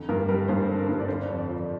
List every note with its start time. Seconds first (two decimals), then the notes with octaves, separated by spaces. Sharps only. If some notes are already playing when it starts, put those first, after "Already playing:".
Already playing: F2 D3
0.09 G2 A#4
0.29 G3 A#4
0.48 G2 C5
0.69 D3
0.79 A#4
0.89 G2
1.00 D5
1.08 D3 C5
1.29 F2 C5
1.39 D5
1.48 F3